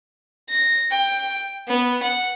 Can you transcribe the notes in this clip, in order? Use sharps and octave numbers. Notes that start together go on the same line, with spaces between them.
A#6
G5
B3
F#5